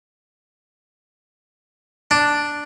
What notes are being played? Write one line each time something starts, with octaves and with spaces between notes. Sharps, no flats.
D4